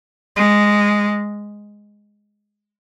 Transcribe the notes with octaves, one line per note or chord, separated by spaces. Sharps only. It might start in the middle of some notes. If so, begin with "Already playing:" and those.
G#3